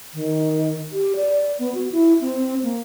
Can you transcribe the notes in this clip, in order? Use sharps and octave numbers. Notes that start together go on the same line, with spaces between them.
D#3
G4
D5
B3
F#4
E4
C4
A#3